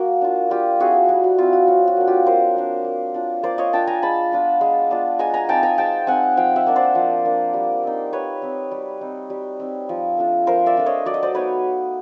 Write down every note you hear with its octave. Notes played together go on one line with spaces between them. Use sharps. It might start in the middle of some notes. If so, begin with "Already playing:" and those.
Already playing: A#3 F#4
D4 F4
G3 F4 G4
C4 E4 F#4 G#4
G3 F#4
F#4
C4 E4 F4
F#4
F#3 F4
F#4
A#3 D4
F4 G4
F#3 A#4 C5
A#3 D4
A#3
D4 F4
A#3 C5 D5
C#5 D#5
D4 F4 G5 A5
G#5 A#5
G#3 A5 B5
B3 D4 F4
G#3
B3 D4 F4
G#3 G#5 A#5
G#5 A#5
C4 D#4 G5 A5
G#5 A#5
G#3 G5 A5
C4 D#4 F#5 G#5
F3 F5 G5
E5 F#5
A#3 D4
C5 D5
F3
A#3 D4
G3
C4 D#4
G3 B4 C#5
C4 D#4
G3
C4 D#4
G3
C4 D#4
F3
A3 D4 F4
F3 A#4 C5
D5 E5
A3 D4 F4
C#5 D#5
F#3 D5
D#5
C5 D5
B3 D#4 B4 C#5